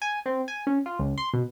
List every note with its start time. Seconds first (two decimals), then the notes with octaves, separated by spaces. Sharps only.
0.02 G#5
0.26 C4
0.48 G#5
0.67 C#4
0.86 F4
0.99 C#2
1.18 C6
1.33 B2